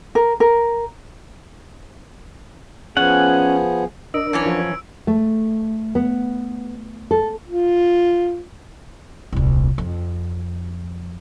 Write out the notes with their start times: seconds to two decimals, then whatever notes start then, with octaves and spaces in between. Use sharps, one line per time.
0.15 A#4
0.40 A#4
2.97 F3 B3 C#4 G#4 F#5
4.14 D4 A#4 D#5 E6 D7
4.33 F#2 E3 C#4 A5
4.46 F3
5.07 A3
5.95 B3
7.11 A4
7.48 F4
9.33 D#1 C2
9.78 F2